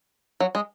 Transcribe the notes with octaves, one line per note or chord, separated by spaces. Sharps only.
F#3
G#3